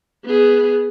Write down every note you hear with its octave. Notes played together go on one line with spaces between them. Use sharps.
B3 G#4